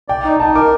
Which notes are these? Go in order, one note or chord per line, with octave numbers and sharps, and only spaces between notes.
D5 G5
D#4
D#4 A5
A#4 D6